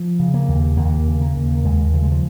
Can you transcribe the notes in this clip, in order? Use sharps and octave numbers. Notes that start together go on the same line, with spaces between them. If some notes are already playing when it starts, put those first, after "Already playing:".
Already playing: F3
C#3
A#3
D#2
D#2 A#3
C#3
A#3
D#2
D#2 G#3
C#3 F3
G#3
F3